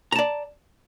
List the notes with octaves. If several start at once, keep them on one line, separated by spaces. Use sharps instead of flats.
D5 A5 A#5